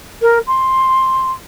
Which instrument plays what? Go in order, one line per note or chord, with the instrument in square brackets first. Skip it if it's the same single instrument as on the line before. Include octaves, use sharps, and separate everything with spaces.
[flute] A#4
C6